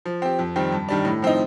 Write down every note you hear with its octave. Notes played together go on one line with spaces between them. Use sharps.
F3
C4 G4
F2
D#3 G3 C4
G2
D#3 G3 D4
A2
F3 C4 D#4